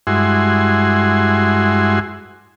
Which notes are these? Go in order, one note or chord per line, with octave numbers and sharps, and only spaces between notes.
G2 G#3 E4 F#4 G#5 C6